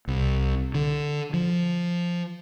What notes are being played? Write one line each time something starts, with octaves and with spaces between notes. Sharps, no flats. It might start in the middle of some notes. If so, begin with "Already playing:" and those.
C2
D3
F3